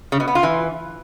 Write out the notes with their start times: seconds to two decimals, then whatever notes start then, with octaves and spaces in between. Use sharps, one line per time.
0.12 C#3
0.20 B2
0.28 B3
0.35 F4
0.43 E3